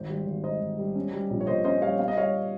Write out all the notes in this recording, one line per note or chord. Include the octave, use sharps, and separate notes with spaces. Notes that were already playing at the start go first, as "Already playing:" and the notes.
Already playing: G#1 C5
G3
G#1
G#2 C5 D#5
G#1
G3
C#4
G3
A#1
C#5
A#2 C5 D#5
C#4 C5 D#5
G3 C#5 F5
C4 F5
D#5
G3 C#5 F5